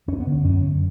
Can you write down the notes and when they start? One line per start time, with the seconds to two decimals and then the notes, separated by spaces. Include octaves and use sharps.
0.08 F#2 C#4
0.20 B3
0.27 D3
0.32 C#4
0.44 F#2 C#4
0.62 D3